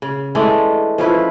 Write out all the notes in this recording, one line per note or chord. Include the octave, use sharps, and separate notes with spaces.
C#3
E3 G#3 A3 D4
F3 C#4 E4 B4